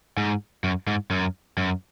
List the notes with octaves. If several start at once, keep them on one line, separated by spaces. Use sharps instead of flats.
G#2
F#2
G#2
F#2
F#2